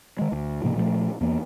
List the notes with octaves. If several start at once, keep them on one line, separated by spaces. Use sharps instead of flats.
D#3 G#3
D2
G#2 C3 F3 A#3
A#2 F3 G3 A3
E2 E3 A#3